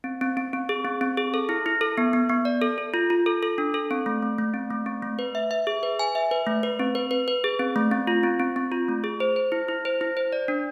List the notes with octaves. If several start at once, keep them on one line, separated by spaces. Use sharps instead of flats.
C4
C4
C4
C4
G#4
C4
C4
G#4
A4
E4
E4
A4
B3
B3
B3
D5
A4
A4
F4
F4
A4
A4
D4
A4
C4
A3
A3
A3
C4
A3
C4
A3
B4
E5
E5
G#4
B4
G#5
E5
B4
A3
B4
C4
B4
B4
B4
G#4
C4
A3
C4
F4
C4
C4
C4
F4
A3
G#4
C5
C5
E4
E4
C5
E4
C5
D5
D4